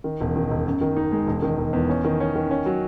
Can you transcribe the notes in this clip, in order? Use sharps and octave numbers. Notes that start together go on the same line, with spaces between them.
D#3
E1
D#3
E1
F#2
D#3
D#4
G#3
E1
D#3
E1
E2
C#4
D#3
C#4
D#3
C#4
F#3